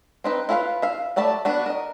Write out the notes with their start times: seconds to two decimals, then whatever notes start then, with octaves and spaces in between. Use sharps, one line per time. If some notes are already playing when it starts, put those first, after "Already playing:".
0.24 C4 D#4 B4
0.49 E4 F4 B4 E5 F5
0.82 E5 F5
1.16 F#3 A3 D5 A5 B5
1.45 B3 D4 F#4
1.66 A#4 D#5